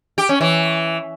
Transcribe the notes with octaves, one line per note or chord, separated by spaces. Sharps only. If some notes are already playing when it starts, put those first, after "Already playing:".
G4
C#4
E3